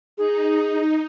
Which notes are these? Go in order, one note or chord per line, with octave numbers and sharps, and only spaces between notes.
D#4 G#4